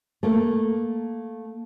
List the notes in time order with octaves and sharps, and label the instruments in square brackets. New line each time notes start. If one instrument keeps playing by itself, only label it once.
[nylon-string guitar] A3 A#3